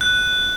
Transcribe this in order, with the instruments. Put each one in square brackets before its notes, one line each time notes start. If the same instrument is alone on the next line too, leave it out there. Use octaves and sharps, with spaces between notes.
[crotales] F#6